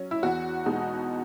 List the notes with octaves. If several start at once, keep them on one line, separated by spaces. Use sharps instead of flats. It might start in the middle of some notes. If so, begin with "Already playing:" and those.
Already playing: F#3 C#4
E4
E2 F#4
B2 G#3 D#4